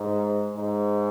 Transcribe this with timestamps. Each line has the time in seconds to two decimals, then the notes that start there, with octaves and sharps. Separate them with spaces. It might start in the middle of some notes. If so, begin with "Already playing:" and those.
Already playing: G#2
0.56 G#2